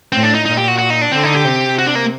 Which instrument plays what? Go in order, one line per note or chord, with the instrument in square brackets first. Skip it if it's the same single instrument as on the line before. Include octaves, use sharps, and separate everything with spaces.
[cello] A2 [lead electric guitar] C4
[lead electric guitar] D4
D#4
[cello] A#2 [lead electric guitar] D#4
[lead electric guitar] G4
F#4
F#4
D#4
D4
[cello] D3 [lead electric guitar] C4
[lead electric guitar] D#4
G4
[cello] C3
[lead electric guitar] F#4
D4
A#3